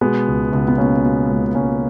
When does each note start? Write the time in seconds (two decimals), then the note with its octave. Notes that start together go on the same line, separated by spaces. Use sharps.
0.01 B2 G#3 B3
0.27 C#2
0.52 C#2
0.68 B3
0.78 B2 A#3 C#4
1.04 B2
1.29 C#2
1.55 C#2 A#3 C#4